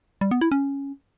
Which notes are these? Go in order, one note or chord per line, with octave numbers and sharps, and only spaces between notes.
G3
B3
E4
C#4